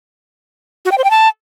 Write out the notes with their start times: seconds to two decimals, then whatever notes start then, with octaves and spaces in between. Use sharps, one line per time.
0.85 F#4
0.92 G5
0.98 C5
1.04 G5
1.10 A5